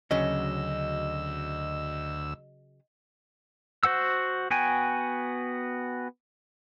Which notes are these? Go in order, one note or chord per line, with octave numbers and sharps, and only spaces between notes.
D2 C#3 F#3 C#4 D#5 E6
F#4 C5 F#5 E6
B3 F#4 G5 G#5